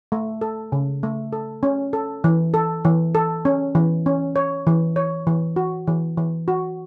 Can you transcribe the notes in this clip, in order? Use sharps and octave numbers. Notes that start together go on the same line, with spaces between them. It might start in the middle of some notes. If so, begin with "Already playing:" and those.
A3
A4
C#3
A3
A4
C#4
A4
E3
A4
E3
A4
C#4
E3
C#4
C#5
E3
C#5
E3
F#4
E3
E3
F#4